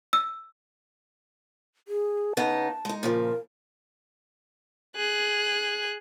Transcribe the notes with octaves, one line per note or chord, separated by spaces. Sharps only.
E6
G#4
C#3 B3 D#4 A5
G#3 D#4
A#2 C#3 F3 A#4
G#4 F#6